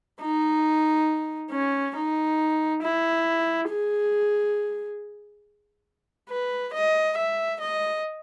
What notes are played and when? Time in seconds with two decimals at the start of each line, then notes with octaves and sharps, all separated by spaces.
0.21 D#4
1.51 C#4
1.96 D#4
2.82 E4
3.69 G#4
6.29 B4
6.73 D#5
7.17 E5
7.61 D#5